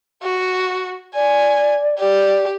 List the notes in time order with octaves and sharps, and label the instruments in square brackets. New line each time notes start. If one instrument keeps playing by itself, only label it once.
[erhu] F#4
[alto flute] D5 [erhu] G#5
[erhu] G4 [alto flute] D5